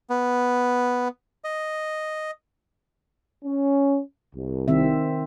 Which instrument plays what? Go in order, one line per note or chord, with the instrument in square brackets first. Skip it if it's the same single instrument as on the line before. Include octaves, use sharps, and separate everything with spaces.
[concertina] B3
D#5
[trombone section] C#4
C2
[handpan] D#3 C4 E5